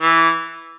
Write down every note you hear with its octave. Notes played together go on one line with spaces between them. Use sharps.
E3